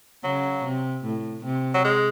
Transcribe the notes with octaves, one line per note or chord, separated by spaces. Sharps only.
C#3 F#3
C3
A2
C3
F#3
G#3